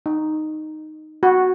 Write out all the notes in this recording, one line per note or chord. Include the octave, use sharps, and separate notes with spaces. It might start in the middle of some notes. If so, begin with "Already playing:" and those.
D#4
F#4